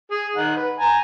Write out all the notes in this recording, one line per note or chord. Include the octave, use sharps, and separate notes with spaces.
G#4
D#3 D#4 F#5
B4
G#5 A#5